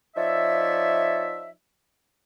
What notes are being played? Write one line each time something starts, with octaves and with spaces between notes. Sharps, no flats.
F3 D#4 C#5 D5 E5